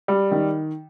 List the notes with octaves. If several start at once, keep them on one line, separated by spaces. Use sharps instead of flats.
G3
D#3